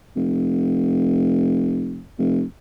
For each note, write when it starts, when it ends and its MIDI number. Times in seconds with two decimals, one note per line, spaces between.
0.16 2.10 29
2.19 2.43 29